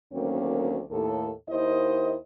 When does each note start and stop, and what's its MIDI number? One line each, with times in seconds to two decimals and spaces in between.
0.13 0.82 38
0.13 0.82 51
0.13 0.82 54
0.13 0.82 58
0.13 0.82 60
0.13 0.82 61
0.90 1.30 39
0.90 1.30 45
0.90 1.30 69
1.49 2.15 39
1.49 2.15 51
1.49 2.15 64
1.49 2.15 72
1.49 2.15 75